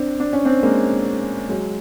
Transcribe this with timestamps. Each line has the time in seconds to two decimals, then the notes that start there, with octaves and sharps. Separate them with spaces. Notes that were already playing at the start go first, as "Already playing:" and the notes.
Already playing: C4 D4
0.20 D4
0.33 C#4
0.45 C4 D4
0.63 G#3 A#3
1.49 F#3 G#3